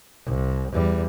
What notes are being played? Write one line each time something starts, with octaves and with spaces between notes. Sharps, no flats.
C2
E2 G3